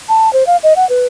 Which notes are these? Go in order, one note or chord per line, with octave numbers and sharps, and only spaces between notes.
A5
C5
F5
D#5
F#5
B4